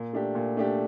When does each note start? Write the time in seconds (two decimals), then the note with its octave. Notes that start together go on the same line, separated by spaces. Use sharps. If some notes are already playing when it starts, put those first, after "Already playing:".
Already playing: A#2
0.13 A3 D4 G4
0.35 A#2
0.57 A3 D4 G4